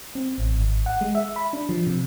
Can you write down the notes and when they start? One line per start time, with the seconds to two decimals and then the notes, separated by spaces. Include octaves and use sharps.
0.15 C4
0.38 A1
0.58 G#1
0.86 F#5
1.01 G#3
1.15 E5
1.36 B5
1.53 D4
1.69 F3
1.87 C3